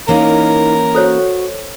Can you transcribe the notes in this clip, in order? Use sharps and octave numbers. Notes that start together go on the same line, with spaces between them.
E3 A#3 C#4 D#4 A#4
F#4 A4 C5 C#5